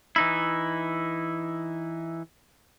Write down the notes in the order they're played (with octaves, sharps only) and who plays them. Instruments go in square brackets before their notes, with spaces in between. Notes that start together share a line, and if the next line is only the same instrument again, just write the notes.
[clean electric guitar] E3 D#4 E4